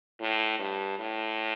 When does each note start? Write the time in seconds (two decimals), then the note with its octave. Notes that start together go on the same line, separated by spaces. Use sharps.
0.21 A2
0.59 G2
0.98 A2